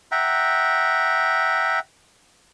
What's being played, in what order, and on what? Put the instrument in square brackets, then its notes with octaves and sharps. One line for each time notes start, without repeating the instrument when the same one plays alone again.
[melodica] E5 F#5 G5 A#5